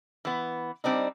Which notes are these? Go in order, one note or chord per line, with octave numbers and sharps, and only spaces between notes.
E3 B3
G3 C4 D4 D#4